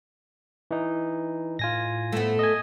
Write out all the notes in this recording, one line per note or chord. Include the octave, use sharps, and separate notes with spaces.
E3 D#4
A2 F4 G#5 A#6
A3 B3
D#5 G#5